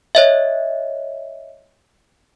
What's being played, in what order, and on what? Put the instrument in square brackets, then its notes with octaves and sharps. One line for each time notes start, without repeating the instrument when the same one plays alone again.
[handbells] C#5 D#5 E5